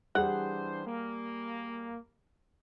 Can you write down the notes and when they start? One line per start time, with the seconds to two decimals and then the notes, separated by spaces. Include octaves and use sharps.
0.15 E3 G3 D4 G#4 C5 F#5
0.85 A#3